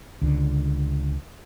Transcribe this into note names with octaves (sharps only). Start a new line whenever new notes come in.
C#2 D3